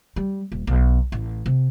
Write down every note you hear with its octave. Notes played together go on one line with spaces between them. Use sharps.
G3
D#1
B1
A1
C3